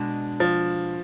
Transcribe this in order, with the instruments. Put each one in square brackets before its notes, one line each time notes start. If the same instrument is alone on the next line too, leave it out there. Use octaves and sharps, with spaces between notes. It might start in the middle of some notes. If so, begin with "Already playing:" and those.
Already playing: [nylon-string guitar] B2 G#3 D4
[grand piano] F3